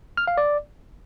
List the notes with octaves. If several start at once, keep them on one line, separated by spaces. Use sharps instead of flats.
F6
F5
D5